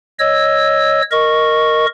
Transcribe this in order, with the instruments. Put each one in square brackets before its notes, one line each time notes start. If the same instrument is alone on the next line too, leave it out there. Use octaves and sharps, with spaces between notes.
[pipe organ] C#5 D#5 E6
A#4 D#5 C#6